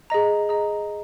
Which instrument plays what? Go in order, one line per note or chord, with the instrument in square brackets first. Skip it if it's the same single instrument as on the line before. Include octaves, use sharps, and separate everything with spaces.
[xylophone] G#4 D#5 A#5
G#4 D#5 A#5